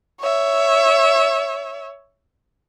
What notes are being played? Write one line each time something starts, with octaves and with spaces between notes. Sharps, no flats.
C#5 E5